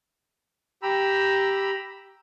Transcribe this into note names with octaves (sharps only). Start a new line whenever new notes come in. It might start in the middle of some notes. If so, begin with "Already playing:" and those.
G4 G5 A#5 B5 E6